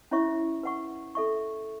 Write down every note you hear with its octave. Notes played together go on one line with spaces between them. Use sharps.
C#4 E4 C#5 E5 C#6
B4 F#5 C#6
A4 E5 C#6